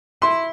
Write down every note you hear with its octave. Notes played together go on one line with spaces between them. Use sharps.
E4 C6